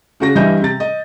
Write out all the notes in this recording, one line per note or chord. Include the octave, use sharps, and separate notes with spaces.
C#3 F#4 A#6
G2 E3 G3 D#5 E5 G6
C3 A6
D#5